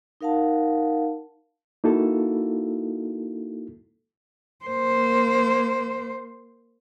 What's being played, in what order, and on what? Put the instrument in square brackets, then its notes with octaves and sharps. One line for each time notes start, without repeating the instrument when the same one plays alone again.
[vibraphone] D#4 A#4 F5 F#5 A5
[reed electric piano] A#3 D#4 E4 F#4 A4
[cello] A#3 C5